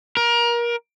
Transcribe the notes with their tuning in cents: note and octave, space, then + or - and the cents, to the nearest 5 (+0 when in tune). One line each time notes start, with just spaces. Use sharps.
A#4 +25